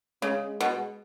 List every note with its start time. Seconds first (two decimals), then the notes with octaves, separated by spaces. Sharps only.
0.22 C#3 G#3
0.61 B2